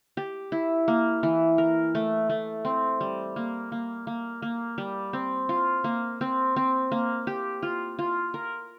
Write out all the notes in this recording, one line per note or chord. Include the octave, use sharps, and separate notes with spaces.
G4
E4
A#3
E3
A#4
A3
A3
C4
G3
A#3
A#3
A#3
A#3
G3
C4
F4
A#3
C4
C4
A#3
G4
F4
F4
A#4